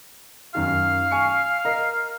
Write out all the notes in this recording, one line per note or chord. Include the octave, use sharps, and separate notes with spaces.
F#2 D#3 F5
G#5 C#6 C#7
A#4 D#5